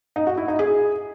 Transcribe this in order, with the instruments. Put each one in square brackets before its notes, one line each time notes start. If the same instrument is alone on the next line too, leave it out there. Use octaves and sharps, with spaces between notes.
[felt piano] D#4
F#4
E4
D#4
G#4